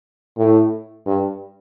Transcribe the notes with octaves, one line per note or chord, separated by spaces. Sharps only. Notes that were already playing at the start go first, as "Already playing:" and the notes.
A2
G2